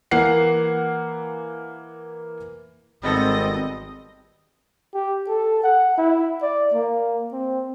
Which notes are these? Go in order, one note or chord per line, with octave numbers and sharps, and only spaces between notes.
E3 A#3 F#5 C7
G#1 G3 B3 C4 A4 D#5
G4
A4
F#5
E4
D5
A#3
C4